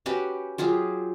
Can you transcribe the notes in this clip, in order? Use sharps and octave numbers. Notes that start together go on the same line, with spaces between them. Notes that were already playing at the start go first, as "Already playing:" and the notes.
C#4 F#4 G4 B4
F#3 F4 G4 G#4